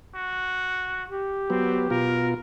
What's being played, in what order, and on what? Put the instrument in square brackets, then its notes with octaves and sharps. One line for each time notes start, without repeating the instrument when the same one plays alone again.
[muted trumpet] F#4
[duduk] G4
[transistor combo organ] F#3 B3 [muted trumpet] C4
[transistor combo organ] B2 F4 [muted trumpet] A#4